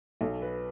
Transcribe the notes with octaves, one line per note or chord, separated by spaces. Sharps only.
B1 A4
B4